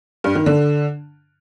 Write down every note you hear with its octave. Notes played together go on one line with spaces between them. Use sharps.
G2
D#3
D3